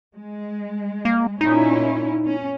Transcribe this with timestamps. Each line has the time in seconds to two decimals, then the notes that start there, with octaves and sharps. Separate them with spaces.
0.16 G#3
1.05 A#3
1.41 A#2 C#4 D#4 E4
2.25 C#4